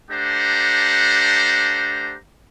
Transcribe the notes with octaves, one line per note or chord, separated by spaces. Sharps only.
A3 D4 G4 C5 F#5 A#5